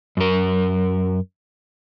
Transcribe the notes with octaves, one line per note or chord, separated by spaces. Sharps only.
F#2 A#4